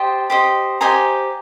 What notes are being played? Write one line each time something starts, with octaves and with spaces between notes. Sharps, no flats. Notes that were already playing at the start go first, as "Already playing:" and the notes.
Already playing: G4 C5 D#5 G5 A5
G4 C5 D#5
G4 C5 D#5 G#5 A#5